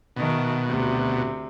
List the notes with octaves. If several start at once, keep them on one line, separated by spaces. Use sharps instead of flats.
B2 D#3 A3
D2 C3